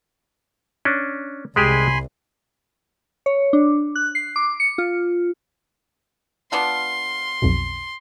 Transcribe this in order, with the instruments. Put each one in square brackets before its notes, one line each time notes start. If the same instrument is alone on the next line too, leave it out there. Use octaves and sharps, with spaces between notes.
[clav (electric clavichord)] C#4 D4
[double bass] C2 [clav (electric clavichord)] G#3 G4 G#4 [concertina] G#5 B5 C6
[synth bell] C#5
D4
F#6
C7
D6
C#7
F4
[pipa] B3 D4 F4 [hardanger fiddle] C6
[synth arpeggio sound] B1 F2 B2